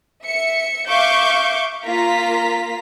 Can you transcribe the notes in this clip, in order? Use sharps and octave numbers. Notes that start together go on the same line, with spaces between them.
E5 C#7
E5 F5 C#6 D6 G6
A#3 F4 A#5 B6